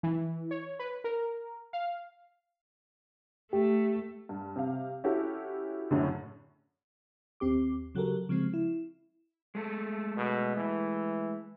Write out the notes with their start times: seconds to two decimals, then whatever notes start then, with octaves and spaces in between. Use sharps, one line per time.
0.03 E3
0.51 C#5
0.79 B4
1.04 A#4
1.73 F5
3.53 A3 G4
4.29 G2
4.56 C3 F5
5.04 C#4 E4 F#4 G4 A4
5.91 F#2 A2 D3
7.40 D#2 C4 G4 D6
7.95 C#3 F#3 F#4 G4 A4 A#4
8.29 C#3 F3 G#3 C4
8.54 E4
9.55 G#3 A3 A4
10.17 B2
10.57 E3